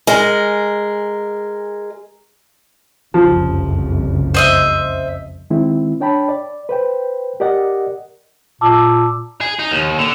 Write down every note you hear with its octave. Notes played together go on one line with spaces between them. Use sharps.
G#3 A#4
F#1 C2 F2 F3
C5 D#5 E5
D#3 G#3 C4 E4
D4 C#5 G5 A5 B5
D5
B4 C5 G5
G4 A#4 D5 D#5 F#5
A#2 A5 D6 E6
G#4
D#4
D#2
D3